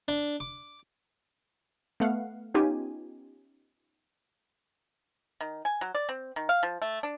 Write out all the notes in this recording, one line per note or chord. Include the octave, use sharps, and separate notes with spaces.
D4
D6
A3 B3 F5 F#5
B3 C#4 D#4 F4 G4 G#5
D#3
G#5
F#3
D5
C4
D#3
F5
F3
A3
D4